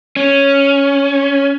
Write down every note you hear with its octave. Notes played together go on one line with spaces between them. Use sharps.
C#4